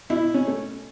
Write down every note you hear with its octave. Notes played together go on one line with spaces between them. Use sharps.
B2 E4
C#4
A3